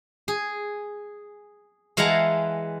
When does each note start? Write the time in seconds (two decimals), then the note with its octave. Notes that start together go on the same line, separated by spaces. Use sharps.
0.28 G#4
1.97 E3 G#3 F5 F#5 A5 A#5